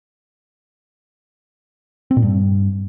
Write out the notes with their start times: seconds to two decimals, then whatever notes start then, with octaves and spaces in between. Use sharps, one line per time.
2.11 C4
2.17 A#2
2.23 G2